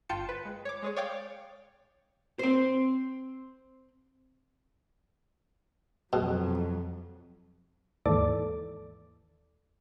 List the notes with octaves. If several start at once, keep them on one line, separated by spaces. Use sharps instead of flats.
G1 F4 G5 A5 C#7
B4
G#3
C#5 D6
G#3 G#4 C#5
C#5 D5 F5 G5 D6
C4 C5
F2 B2 F#3
D#2 G#2 E3 A4 D5 D6